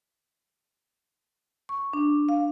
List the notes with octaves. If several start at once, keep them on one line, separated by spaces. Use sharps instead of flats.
C#6
D4
F5